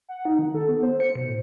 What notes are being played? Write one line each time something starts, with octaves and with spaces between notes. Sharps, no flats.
F#5
D#4
D#3
A4
B3
C5
C#7
B2
A2